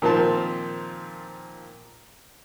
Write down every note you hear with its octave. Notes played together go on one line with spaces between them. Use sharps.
A#2 D#3 F3 A#3 C4 A5